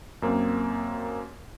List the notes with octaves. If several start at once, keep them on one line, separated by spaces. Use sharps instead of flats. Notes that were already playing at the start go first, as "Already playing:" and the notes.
F#2 A#3 C4